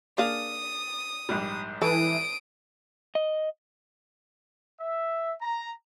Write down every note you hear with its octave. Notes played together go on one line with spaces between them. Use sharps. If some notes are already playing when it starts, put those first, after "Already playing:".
A#3 D4 G#4 F5 D#6
A#1 G#2 G3
E3 A4 D#6 D7
D#5
E5
A#5